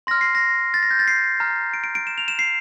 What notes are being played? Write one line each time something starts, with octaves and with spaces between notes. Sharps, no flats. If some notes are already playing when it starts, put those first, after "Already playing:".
C6 F6 A#6
C7
A#6
A6
A#6
G6
A6
C7
A#5 F6
D7
D7
D7
E7
F7
E7
C7